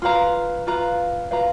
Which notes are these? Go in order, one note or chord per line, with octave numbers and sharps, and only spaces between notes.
F4 B4 F5 A#5
F4 B4 F5 A#5
F4 B4 F5 A#5